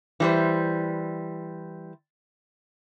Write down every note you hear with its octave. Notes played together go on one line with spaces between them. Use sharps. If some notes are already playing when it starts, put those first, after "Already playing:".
E3 G3 C5